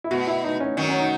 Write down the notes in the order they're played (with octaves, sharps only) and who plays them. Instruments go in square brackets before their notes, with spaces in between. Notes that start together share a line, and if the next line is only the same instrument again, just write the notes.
[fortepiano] E4
[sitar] B2 [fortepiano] F#4
[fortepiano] E4
D#4
C#4
[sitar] D#3 F#3 [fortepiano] C#4
[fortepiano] C#4
D#4